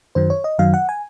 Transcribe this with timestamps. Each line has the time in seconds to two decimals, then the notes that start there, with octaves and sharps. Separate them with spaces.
0.15 F#2 D#3 F#3 C5
0.30 C#5
0.44 D#5
0.58 F#2 D#3 F#3 F5
0.74 F#5
0.89 G#5